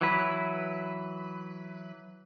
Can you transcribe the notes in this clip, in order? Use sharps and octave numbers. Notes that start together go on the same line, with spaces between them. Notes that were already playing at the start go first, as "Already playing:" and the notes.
E3 F#3 B4